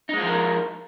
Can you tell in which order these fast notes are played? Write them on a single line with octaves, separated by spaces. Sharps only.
D#4 G#3 F4 F3 A#4